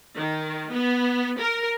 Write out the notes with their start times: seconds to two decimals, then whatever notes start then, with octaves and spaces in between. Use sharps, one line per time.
0.17 D#3
0.73 B3
1.39 A#4